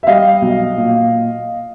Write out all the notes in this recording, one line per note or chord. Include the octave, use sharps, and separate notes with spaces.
E5
G3 D#5 F5
B1
A#2